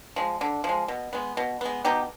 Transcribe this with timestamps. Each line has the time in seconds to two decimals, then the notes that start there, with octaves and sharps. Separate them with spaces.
0.16 F3 G#3
0.41 D3
0.64 F3 G#3
0.88 B2
1.13 G#3 B3
1.37 B2
1.61 G#3 B3
1.85 B2 D#4 G4